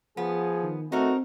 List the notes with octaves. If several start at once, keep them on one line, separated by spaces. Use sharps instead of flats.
F3 B3 G#4
D#3
A3 C4 D#4 F#4 A#4